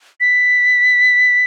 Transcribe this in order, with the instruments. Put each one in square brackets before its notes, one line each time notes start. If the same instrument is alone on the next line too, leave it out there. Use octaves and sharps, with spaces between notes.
[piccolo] B6